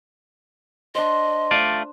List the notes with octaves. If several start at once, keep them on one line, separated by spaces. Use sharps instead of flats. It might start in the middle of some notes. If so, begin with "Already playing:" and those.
D4 C5 D#5
A3 F4 D5